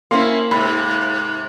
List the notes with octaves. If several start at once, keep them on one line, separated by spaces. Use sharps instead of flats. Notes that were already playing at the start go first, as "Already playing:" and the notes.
A#3 C4 C#4 E4 C6
G#2 C3 B5